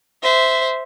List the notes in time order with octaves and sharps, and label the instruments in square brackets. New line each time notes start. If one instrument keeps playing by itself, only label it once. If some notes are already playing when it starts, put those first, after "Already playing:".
[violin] C5 E5